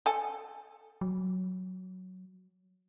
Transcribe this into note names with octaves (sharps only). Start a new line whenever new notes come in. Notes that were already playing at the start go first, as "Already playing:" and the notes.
A4 G#5
F#3